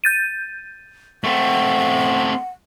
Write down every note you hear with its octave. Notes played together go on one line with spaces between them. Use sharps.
G6 A6 D#7
A3 C4 F#5